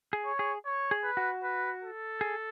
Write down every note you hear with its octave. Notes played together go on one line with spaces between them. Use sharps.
G#4
C#5
G#4
C#5
G#4
B4
F#4
B4
A4
G#4